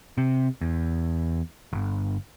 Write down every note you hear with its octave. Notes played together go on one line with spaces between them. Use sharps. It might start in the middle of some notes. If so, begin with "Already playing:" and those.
C3
E2
G1